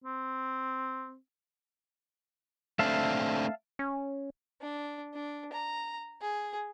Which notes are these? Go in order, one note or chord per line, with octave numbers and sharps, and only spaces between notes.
C4
A3 C4 D4 E5 F5 A5
C#4
D4
D4
A#5
G#4